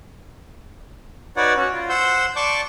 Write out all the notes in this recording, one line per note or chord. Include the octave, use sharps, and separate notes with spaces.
D#4 F#4 B4 C#5 D5 F#5
C#4 F#4
F4
C5 F#5 C6 E6 G6
D5 A5 C#6 D6 G6